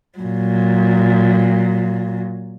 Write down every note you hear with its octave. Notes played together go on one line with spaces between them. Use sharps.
A#2 F#3